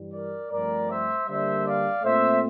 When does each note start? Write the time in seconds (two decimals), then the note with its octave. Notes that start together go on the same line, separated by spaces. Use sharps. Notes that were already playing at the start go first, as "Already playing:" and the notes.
Already playing: G2 E3 G3
0.12 A#4 D5
0.50 G2 F3 A3 C4 A#4 D5
0.88 C5 E5
1.27 D3 G3 A#3 D4 C5 E5
1.65 D5 F5
2.03 A#2 A3 C4 C5 E5